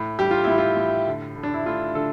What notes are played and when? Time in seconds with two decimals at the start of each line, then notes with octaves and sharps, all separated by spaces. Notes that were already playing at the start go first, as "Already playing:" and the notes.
Already playing: A2
0.19 G3 G4
0.31 F4
0.44 A2 E4
0.58 F4
0.77 A2
1.06 D3
1.36 D3
1.43 D4
1.54 E4
1.66 A3 F4
1.95 D3 A4